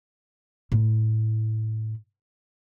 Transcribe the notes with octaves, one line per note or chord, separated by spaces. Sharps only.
A2 E4